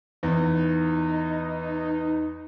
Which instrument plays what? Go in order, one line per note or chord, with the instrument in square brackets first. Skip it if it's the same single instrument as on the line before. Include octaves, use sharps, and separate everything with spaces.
[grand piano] E2 [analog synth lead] D#4